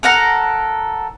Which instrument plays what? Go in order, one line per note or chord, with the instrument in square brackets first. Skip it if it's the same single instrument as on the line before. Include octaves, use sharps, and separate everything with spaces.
[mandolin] A4 A#4 F#5 A#5